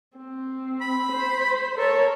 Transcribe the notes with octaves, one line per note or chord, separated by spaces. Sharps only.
C4
B5
C5
A4 A#4 C#5